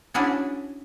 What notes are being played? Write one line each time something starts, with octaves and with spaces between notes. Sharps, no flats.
C#4 D4 E4 F#4 G#4